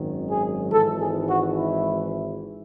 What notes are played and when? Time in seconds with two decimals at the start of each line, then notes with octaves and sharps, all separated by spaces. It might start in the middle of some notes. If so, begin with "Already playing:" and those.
Already playing: G#1 F#2 D#3 F#3
0.30 G#4
0.72 G#1 G#2 E3 A4
1.01 G#4
1.30 F#4
1.57 E4